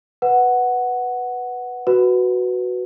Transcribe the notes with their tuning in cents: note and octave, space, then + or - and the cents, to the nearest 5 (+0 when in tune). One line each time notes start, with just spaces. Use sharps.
B4 +0 F#5 +0
F#4 +0 B4 +0